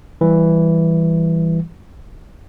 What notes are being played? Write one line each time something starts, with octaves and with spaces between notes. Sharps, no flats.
E3 G3